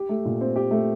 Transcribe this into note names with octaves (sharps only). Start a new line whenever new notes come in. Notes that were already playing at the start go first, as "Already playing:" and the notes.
Already playing: G4
A3
A#2
C4
G4
A3